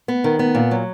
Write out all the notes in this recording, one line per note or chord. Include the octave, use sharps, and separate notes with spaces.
B3
D#3
B3
A#2
F#3